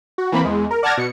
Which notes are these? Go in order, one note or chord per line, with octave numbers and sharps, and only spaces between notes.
F#4
E3 A#3 C4 B5
E2 G#3
A#4
D5 F#5 A5 F6 G#6 A#6
B2 C#7